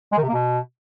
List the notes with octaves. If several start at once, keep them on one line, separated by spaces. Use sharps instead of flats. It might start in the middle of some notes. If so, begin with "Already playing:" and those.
G#3
D#3
C3
A#3
B2